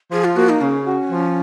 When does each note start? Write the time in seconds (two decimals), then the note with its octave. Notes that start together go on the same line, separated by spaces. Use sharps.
0.12 F3 G#4
0.24 F4
0.36 A#3 F#4
0.49 D#4
0.62 C#3 C#4
0.86 F#4
1.11 F3